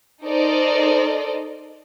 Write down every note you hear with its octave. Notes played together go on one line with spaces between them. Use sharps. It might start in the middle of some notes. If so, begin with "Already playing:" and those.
D#4 A4 A#4 C5 D5 D#5